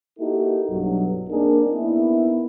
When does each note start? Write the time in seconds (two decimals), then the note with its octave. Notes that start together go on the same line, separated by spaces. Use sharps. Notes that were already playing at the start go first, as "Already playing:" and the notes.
0.19 A#3 D#4 E4 F#4 G4 A4
0.70 B1 G2 F#3
1.29 A#3 C4 D4 D#4 G#4 A#4
1.72 A#3 B3 D#4 E4